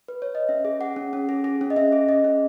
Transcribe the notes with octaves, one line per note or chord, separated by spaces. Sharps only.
B4
C#5
D#5
C#4 E5
G#4
G#4 F#5
C#4
C#4
G#4
G#4
C#4
D#5
C#4 E5
G#4
G#4 D#5
C#4